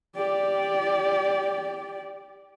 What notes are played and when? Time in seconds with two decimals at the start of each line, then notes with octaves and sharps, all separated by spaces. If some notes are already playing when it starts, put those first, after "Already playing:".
0.16 G4 D5